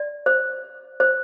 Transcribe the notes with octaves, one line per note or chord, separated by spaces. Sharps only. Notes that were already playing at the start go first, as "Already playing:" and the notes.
Already playing: D5
C5
C5